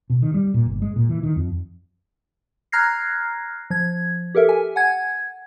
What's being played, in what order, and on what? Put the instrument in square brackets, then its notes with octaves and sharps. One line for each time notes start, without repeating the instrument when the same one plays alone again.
[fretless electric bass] B2
D#3
G3
A#2
G1
G#3
A#2
E3
D#3
F2
[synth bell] A#5 F6 F#6 G#6 A#6 C7
F3 G#6
G4 A4 A#4 E5
G#5
F#5 G#5 G#6